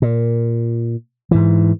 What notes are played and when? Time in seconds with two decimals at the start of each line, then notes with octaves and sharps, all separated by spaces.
0.02 A#2
1.31 G#2 E3